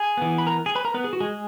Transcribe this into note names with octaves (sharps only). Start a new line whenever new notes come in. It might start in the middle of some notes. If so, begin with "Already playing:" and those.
Already playing: G#4 G#5
E3 B3
B5
A#4 A#5
G#4 G#5
B4 B5
A#4 A#5
B3 B4
G#4
F#4
G#3 G#4